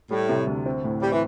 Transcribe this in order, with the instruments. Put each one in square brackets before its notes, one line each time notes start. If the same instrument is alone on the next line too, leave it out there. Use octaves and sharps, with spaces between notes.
[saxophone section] A2 [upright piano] G3
[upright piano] C3
D2
C4
A2
[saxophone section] G3 [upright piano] C4
[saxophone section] E3